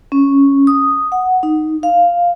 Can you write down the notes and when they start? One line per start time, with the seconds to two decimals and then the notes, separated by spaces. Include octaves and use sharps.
0.12 C#4
0.67 D#6
1.12 F#5
1.43 D#4
1.83 F5